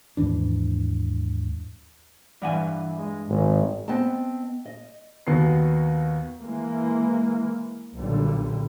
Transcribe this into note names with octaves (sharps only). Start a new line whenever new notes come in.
D#2 G#2 E3 D4
G2 E3 F#5 G#5
G#3
G#1 G#2
B3 C4 D#5 A5
D#5
D#2 D#3 B3 F#4 C7
E3 G#3 A#3
B1 A#2 D3 G3